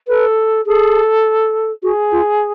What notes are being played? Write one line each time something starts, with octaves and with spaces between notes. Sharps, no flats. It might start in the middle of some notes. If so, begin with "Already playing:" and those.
A4 B4
G#4 A4
F#4 G#4
F4